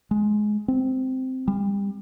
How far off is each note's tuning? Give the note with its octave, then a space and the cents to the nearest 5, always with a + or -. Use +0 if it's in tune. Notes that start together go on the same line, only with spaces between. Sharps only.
G#3 +15
C4 -10
G3 +30